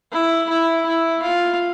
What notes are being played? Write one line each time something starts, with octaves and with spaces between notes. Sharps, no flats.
E4
E4
E4
F4